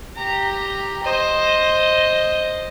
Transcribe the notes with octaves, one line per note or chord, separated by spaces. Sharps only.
G4 A#5
C5 D#5